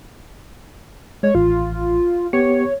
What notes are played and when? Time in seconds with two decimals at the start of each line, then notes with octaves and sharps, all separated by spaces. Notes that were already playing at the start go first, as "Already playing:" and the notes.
1.23 G#3 C#5
1.35 A1 F4
2.33 B3 G4 C#5 C#7